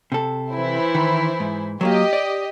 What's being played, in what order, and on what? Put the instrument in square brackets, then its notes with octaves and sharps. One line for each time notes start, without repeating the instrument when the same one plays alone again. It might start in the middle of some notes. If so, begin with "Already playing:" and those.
[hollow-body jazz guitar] C3 A4
[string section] E3 E4 C5
[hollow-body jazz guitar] D#3
G#2
[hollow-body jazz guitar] F#3 A3 A#3 [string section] G4 D#5
[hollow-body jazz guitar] D5